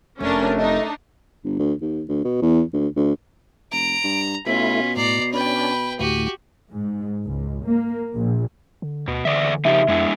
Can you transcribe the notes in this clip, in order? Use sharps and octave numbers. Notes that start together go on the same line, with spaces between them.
F1 A3 C#4 D4 A#4
D4 D#4 D#5
G1
D2
D#2
D2
B2
E2
D2
D2
F1 A#5 D7
G2
B2 A3 C#4 E4 F4 B6
A2 D5 A#5 C7
C#4 D4 B4 G5 B5
D2 A2 F#4 G4 D#7
G#2
C#2
A#3
A#1
D3
D2 B2
E2 D3 D5 E5
C#3 F3 D#4 G4 E5
F2 G#3 D4 E4